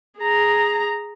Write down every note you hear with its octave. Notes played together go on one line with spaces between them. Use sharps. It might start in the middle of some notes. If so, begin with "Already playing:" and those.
G#4 A#5